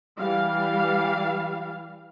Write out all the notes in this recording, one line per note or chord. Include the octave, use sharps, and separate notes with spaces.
E3 G3 F5